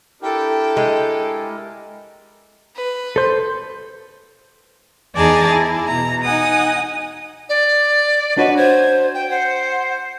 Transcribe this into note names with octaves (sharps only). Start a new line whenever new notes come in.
D4 E4 G4 A4 A#4 G5
G#3
B4
A4 C5
E2 D#4 G#4 D5 A5 A#5
E4
B2 A#5
D#4 F#5 G#5 D#6
D5
D4 F#4 B4 C#5 D#5
C5 G#6
G5
C5 F#5